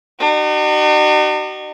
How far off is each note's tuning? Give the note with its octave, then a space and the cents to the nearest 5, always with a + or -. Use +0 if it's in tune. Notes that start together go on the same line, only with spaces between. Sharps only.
D#4 -45 F#4 +45